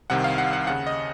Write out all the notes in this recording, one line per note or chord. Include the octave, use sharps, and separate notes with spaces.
C2 C3 D#3 F#5
F5
F#5
F#5
D#2 C#3 F#5
D#5